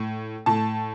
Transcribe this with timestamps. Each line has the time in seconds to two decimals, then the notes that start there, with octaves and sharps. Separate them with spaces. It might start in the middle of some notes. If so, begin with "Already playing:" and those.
Already playing: A2
0.46 A2 A5